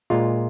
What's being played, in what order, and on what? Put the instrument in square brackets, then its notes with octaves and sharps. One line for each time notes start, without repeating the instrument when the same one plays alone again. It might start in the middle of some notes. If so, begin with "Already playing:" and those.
[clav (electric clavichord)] A#2 G#3 F4